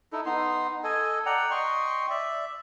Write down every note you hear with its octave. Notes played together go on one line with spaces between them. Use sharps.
D#4 E4 A4
B3 D#4 C6
A4 D#5 G#5
D5 F#5 G5 A#5
D#5 G5 C6 C#6
D5 E5